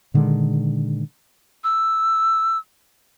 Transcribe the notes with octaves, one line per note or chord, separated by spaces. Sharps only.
A#2 D3 D#3 G#3
E6